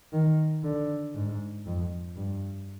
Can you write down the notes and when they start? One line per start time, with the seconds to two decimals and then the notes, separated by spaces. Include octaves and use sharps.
0.13 D#3
0.64 D3
1.15 G#2
1.66 F2
2.17 G2